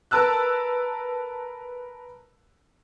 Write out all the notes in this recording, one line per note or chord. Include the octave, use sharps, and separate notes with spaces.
A#4 B4 A5 E6 F#6